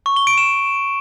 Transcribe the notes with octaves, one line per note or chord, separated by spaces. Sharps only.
C#6
G7
D7
E7